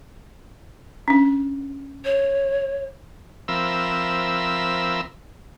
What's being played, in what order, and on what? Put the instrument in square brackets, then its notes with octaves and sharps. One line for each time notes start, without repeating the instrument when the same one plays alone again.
[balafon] C#4 D4
[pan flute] C#5
[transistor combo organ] F3 C4 A#4 E5 B5 E6